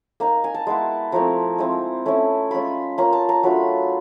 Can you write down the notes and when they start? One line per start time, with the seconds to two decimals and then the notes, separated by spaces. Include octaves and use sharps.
0.20 A#3 D#4 A#5
0.44 G#5
0.54 A5
0.67 G#3 B3 E4
1.12 F3 A3 C4 E4 A#5
1.58 G#3 C4 E4
2.06 A3 C#4 E4
2.51 G#3 C#4 F4 B5
2.98 A#3 C#4 F4 A#5
3.13 A5
3.29 A#5
3.43 F#3 A3 D4 F4 B5